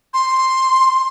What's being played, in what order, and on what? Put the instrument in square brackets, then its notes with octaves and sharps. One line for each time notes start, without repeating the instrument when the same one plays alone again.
[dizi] C6